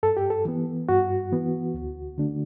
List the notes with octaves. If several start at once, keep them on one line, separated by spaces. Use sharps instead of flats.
G2 A4
G4
A4
E3 B3
G2 F#4
E3 B3
D2
D3 A3 D4